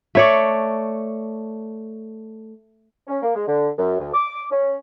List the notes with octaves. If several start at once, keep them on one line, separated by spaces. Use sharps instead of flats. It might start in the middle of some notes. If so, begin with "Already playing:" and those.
A3 C#5 D5
C#4
A#3
G#3
D3
F#2
D2
D6
C#4